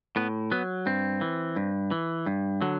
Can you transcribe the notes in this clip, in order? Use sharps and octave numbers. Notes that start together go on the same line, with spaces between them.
A2 B3
F#3 B3
G2 C4
E3
G2
E3
G2
D3 F#3